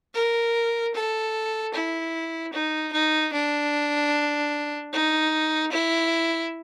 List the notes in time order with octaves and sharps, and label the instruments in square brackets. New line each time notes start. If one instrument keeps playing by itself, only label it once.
[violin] A#4
A4
E4
D#4
D#4
D4
D#4
E4